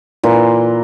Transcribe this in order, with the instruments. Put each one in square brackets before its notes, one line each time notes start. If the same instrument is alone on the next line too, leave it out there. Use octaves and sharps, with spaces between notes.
[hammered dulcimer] A#2 E3 C6